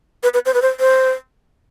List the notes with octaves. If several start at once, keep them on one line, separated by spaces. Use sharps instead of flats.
B4
B4
C5
B4
C5
C5